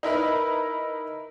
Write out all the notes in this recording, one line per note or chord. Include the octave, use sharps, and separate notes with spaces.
D#4 E4 A#4 B4